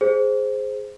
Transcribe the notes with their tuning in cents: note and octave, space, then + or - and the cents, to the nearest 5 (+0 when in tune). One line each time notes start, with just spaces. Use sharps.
G#4 +5 C5 +0